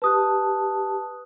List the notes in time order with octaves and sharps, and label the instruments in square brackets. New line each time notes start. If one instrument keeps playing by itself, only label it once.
[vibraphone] G4 A5 [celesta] B4 D#6 F#6